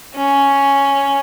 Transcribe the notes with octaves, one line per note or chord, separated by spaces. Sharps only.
C#4